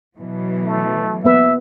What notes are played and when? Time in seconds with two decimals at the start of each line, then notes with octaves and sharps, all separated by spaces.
0.17 B2 E3 F#3
0.64 A3
1.24 A#3 B3 B4 E5